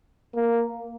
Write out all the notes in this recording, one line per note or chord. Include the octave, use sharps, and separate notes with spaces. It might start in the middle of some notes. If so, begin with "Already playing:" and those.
A#3